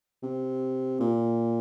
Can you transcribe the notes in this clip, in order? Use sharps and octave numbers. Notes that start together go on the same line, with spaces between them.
C3
A#2